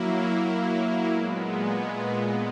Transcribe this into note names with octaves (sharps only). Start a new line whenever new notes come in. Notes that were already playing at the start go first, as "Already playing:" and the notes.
Already playing: F#3 A#3 E4
A#2 G#3 B3